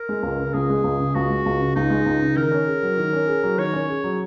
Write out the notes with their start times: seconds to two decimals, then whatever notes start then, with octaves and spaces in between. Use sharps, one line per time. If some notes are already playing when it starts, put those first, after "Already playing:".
Already playing: A#4
0.09 G#3
0.23 C#2
0.39 C#3
0.54 C#2 G#4
0.70 G#3
0.84 C#2
0.99 C#3
1.15 C#2 F#4
1.30 G#3
1.46 C#2
1.60 C#3
1.76 C#2 D#4
1.90 G#3
2.06 C#2
2.22 C#3
2.36 D#3 A#4
2.52 C#4
2.66 G#4
2.83 F#3
2.97 D#3
3.13 C#4
3.27 G#4
3.43 F#3
3.58 D#3 C#5
3.73 C#4
3.89 G#4
4.04 F#3